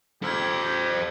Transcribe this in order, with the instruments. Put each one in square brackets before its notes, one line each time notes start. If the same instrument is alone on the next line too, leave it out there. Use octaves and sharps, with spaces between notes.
[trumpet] G4 [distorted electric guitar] A4 C5 [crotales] E6 F6 G#6